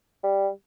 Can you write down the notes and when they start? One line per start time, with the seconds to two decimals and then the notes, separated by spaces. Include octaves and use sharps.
0.24 G3